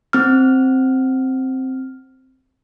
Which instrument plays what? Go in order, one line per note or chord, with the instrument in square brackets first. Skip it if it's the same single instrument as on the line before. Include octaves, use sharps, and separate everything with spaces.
[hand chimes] C4 F6